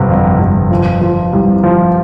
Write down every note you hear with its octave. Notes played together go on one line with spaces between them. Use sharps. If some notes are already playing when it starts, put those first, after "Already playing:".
Already playing: G1 C3
F2
G1
F3
F3
C2
F3